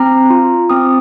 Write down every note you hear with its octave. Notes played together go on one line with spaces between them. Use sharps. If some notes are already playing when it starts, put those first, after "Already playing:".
Already playing: C4 A#5
F4
C4 D#6